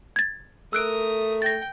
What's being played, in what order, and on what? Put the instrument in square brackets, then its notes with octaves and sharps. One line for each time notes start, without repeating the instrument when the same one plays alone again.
[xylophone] G#6 A6
[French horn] A3 [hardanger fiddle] A#4 D#6 [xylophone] E6 F#6 D7
[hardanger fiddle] G5 [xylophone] A6 A#6